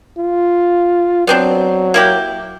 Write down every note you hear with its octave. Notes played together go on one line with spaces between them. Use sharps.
F4
F#3 B3 C4 D4
A#3 E4 G4